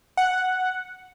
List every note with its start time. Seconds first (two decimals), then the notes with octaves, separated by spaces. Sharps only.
0.17 F#5